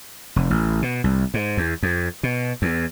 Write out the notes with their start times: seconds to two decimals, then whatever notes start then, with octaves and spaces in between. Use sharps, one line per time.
0.36 F1
0.50 A1
0.82 B2
1.04 C2
1.34 G#2
1.57 E2
1.83 F2
2.23 B2
2.62 E2